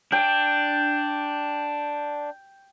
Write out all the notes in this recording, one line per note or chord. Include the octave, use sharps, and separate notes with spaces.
D4 G5